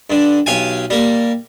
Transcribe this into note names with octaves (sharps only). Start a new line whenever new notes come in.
G2 D3
B1 G4 F5 G5 G#5
G3 A#3